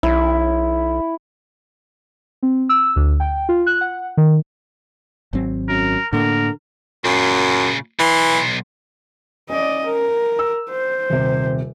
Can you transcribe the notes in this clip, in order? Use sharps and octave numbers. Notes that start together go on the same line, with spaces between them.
B1 E4
C4
E6
D2
G5
F4
F#6
F#5
D#3
G#1 F#3 C4
F#2 A#4
A2 D3 A#3 A#4
F#2 A#2 C#3
B1 E3 C6
C#4 D5 D#5
A#4
E6
C5
D#1 C3